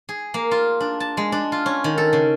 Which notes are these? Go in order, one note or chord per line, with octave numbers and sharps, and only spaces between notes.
G#4
A#3
F4
D4
A5
G#3
D4
F4
C#4
D#3
A4
C#3